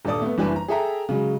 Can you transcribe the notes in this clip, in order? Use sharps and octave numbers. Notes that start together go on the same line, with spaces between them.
D#1 G2 A4 D5 D#6
A3 B3
F#1 E3 G3 D4 B4 G#5
A#5
G#4 A4 E5 G5 A#5
C#3 F#3 G#3